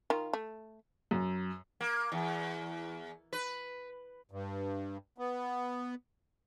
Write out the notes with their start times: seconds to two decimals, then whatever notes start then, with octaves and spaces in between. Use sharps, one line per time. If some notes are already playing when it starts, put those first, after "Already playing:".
0.10 D#3 F4
0.33 A3
1.11 F#2
1.81 A#3
2.12 E2
3.33 B4
4.31 G2
5.18 B3